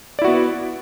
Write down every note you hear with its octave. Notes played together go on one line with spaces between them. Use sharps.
B3 E4 F#4 D5